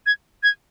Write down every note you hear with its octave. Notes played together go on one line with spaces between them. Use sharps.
G#6
G#6